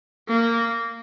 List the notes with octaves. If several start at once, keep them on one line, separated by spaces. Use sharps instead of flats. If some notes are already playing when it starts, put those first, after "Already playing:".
A#3